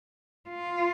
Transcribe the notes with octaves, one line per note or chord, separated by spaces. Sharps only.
F4